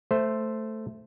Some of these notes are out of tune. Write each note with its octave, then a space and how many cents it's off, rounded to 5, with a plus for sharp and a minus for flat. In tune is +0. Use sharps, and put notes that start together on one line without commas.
A3 +0 C5 +0